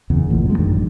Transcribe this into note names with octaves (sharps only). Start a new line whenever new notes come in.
F#1 E2 C#3
A1 E2 A#2
F#2 G#3
A1 F#2 D#3 D4